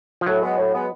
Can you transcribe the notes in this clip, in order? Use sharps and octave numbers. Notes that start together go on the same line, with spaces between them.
F3
A2 F#3
G#3 B3
A2
G#3 B3